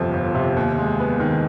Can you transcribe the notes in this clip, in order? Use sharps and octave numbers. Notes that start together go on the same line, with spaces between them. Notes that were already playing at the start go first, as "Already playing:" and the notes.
Already playing: G1 F2 C3 F3
G1
C3
D#2
G#3
B3
D#3